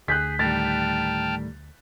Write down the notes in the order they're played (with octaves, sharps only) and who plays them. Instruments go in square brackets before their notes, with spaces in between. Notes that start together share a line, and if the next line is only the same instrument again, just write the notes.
[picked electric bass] D2 [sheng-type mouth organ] G#4 [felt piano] F#6 G6 B6
[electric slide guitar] A2 D#3 G3 [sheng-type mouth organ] G5 A5 F6 [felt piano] A6